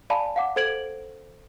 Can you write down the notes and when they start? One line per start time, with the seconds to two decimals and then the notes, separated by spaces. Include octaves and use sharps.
0.10 D5 F5 G#5 A5 B5
0.36 F5 F#5 D6
0.56 A4 C5 G#6 D7 F#7